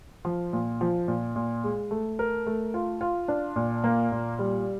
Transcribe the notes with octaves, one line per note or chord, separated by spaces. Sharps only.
F3
A#2
F3
A#2
A#2
G#3
A3
A#4
A3
F4
F4
D4
A#2
A#3
A#2
G3